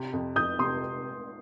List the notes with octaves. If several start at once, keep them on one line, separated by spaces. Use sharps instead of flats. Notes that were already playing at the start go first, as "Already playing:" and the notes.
Already playing: C3
F2
F2 D#6 G6
C3 C6 D#6